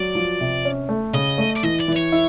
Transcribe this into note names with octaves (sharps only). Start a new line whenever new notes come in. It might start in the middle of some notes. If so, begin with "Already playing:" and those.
Already playing: F#3 D5
F3
C3
C#4
A3
C#3 D#5
A3
D5
E3 D#5
D5
E3
C#5
E4